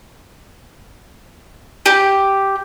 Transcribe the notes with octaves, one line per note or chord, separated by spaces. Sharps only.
G4